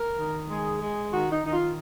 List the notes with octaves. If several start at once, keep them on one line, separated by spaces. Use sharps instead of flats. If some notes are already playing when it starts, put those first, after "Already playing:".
Already playing: A#4
D#3
G#3 G#4
G#3
D#3 F#4
D#4
D#3 D#4
F4